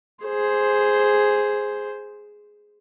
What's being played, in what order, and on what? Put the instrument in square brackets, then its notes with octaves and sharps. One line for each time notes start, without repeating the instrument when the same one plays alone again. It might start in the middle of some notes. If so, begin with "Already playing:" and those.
[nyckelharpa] G#4 C5